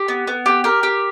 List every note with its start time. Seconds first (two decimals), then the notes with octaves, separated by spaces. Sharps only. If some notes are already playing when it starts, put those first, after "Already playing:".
Already playing: G4
0.08 B3
0.27 B3
0.46 G4
0.64 G4 A#4
0.83 G4